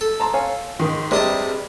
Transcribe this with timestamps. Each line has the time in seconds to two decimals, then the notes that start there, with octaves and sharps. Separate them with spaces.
0.01 A4
0.20 A5 A#5 C6
0.33 C#5 F5 G#5
0.79 G#2 D#3
1.11 C3 G3 G#3 D4 B4 D#5 A5